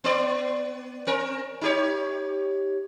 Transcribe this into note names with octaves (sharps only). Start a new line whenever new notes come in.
B3 D5
C4 A#4
D#4 G4 C#5